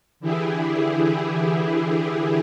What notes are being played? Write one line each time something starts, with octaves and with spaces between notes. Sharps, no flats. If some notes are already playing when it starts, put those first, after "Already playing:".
D3 E3 E4 G4 G#4